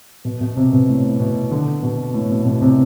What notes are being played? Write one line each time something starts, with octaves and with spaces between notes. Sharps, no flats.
B2
B2
C3
B2
A2
B2
D3
B2
A2
B2
B2
C3